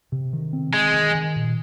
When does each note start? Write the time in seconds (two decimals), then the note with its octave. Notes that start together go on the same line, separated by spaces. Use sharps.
0.12 C3
0.33 D#3
0.53 C4
0.74 D#3 G#3
0.94 D#3
1.15 D#3
1.36 A#2